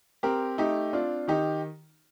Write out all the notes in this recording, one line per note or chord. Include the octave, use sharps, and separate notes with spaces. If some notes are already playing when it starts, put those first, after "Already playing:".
C4 G4 A#4
A3 D#4 G4
C4 D4 F4
D#3 D#4 G4